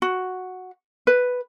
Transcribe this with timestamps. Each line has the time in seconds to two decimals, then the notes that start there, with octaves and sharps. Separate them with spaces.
0.02 F#4
1.07 B4